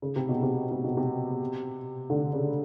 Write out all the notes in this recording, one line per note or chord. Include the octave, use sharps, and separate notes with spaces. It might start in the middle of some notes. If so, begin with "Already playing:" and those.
C#3
C3
B2
C3
C3
B2
C3
D3
C#3